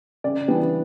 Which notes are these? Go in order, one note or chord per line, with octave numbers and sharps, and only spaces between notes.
C#3 D5
E3 G3 B3 D4